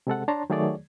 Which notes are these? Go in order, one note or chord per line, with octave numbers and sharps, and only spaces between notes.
C3 G#3 A4 F#5
D4 C#5 A5 A#5 C6
D#3 F#3 A3 G#4 C#5 D5